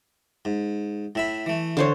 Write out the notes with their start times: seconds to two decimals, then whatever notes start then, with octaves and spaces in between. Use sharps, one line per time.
0.45 G#2
1.15 A2 E5 B5
1.46 E3 A3
1.77 D3 C5 C#5